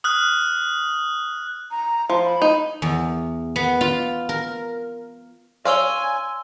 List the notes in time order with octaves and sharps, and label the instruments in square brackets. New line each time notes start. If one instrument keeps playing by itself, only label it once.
[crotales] D#6 F6 F#6
[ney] A#5
[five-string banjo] F3 [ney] C6
[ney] B5
[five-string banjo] D#4
[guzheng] E2
B3
F4
A#4
[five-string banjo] C#5 D5 F5 [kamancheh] G#5 [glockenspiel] C6 E6 G7